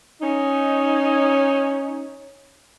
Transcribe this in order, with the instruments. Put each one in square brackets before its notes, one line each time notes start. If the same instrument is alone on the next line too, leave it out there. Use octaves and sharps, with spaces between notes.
[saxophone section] C#4 D#4